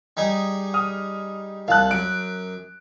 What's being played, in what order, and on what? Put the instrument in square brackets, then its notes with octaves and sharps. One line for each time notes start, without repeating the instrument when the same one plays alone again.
[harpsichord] G3 D#4 G#4
[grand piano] D#6 F6
[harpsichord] C2 A5 [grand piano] F5 F#6
[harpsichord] F#2 [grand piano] D7